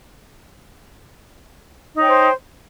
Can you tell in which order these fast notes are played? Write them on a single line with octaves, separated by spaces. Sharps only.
D#4 C#5 G5 C5